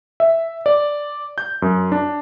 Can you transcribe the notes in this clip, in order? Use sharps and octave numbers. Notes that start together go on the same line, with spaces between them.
E5
D5
G6
F#2
D4